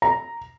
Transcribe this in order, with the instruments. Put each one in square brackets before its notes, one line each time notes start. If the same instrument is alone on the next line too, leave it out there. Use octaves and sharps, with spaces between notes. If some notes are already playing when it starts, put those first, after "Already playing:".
[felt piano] A#5